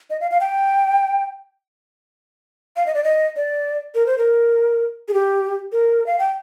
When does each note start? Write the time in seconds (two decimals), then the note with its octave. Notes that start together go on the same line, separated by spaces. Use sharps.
0.10 D#5
0.21 F5
0.31 F5
0.41 G5
2.76 F5
2.86 D#5
2.95 D5
3.04 D#5
3.36 D5
3.95 A#4
4.06 C5
4.18 A#4
5.08 G#4
5.13 G4
5.72 A#4
6.06 F5
6.19 G5